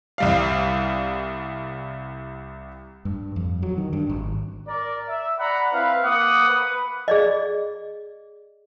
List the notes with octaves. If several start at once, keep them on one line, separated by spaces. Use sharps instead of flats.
C2 G3 F5
G2
F2
F#3
D#3
G2
G#1
A#4 D5
E5
D5 F#5 A#5 B5
C4 E4 B4 F5
A#3 F#5 D6 D#6
B4
G#4 D5 D#5